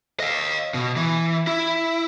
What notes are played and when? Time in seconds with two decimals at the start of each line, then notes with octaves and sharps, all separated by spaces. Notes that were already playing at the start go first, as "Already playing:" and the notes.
0.20 D#5 F5
0.74 B2
0.96 E3
1.47 E4